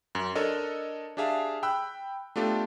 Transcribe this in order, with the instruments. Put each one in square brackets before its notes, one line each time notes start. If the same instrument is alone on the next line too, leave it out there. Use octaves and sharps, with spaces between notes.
[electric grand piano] F#2
D4 A4 A#4 C#5 D#5
D4 G4 G#4 E5 F5 A5
G5 B5 E6 F#6
A3 B3 D4 F4 G4 A4